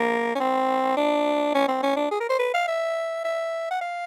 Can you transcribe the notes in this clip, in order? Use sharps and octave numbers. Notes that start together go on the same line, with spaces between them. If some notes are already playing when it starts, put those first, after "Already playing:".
Already playing: A#3
C#4
C4
D4
C#4
C4
C#4
D4
G#4
A#4
C5
B4
F5
E5
E5
F#5
F5